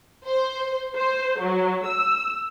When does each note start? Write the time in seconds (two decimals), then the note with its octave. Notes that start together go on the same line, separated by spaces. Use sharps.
0.25 C5
0.95 C5
1.39 F#3
1.85 E6